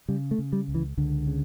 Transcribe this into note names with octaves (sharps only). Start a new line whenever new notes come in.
C#3 G3
A3
C#3
G3
C#2
E3
C#2 D3
C#3